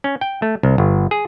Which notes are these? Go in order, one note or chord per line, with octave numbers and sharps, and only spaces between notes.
C#4
G5
A3
C2
G1
G#4